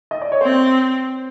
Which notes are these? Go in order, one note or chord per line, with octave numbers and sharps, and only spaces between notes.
D#5
D5
C#5
C4 C5